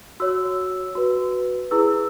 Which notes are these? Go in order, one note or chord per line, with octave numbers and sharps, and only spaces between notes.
F#4 C#5 E6
F#4 B4
E4 G#4 B4 E6